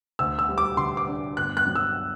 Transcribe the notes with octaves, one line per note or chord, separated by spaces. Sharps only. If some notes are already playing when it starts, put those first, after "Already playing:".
D2 E6
E6
G3
D6
D3 C6
D6
D4
G1 F#6
F#6
F#3
E6